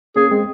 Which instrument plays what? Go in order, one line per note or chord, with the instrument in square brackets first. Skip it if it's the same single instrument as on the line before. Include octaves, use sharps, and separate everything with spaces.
[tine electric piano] A#3 C#4 [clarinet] G#4
[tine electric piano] G#3 C4